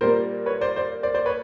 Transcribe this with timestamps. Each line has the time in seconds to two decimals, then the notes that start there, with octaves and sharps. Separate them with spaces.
0.01 A#2 G3 A#3 A#4 C5
0.46 B4 C#5
0.61 C5 D5
0.76 C5 D5
1.03 C5 D5
1.14 C5 D5
1.26 B4 C#5